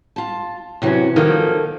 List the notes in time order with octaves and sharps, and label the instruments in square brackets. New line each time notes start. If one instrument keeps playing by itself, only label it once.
[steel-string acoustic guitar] F4 A5
[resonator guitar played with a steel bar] E2 C#4 [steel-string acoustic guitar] C3 E3 F#3
[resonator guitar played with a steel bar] D#3 F3 F#3 [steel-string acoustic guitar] A#3 A4